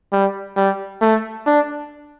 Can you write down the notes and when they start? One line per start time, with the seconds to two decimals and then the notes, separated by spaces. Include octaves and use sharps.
0.13 G3
0.57 G3
1.02 A3
1.47 D4